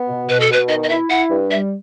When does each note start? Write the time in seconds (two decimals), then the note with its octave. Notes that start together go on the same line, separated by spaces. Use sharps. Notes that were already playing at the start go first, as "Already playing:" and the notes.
Already playing: B3
0.08 B2
0.28 B2 B4
0.40 A4
0.49 B2 B4
0.69 D#3 D#5
0.84 D#5
0.89 E4 E5
1.10 E4 F#5
1.31 G2
1.50 G3 E5